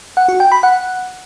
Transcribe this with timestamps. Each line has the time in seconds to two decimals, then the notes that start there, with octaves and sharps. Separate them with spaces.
0.17 F#5
0.28 F#4
0.40 G5
0.52 B5
0.63 F#5